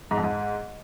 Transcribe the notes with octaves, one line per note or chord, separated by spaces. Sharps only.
G#2
F2
G#2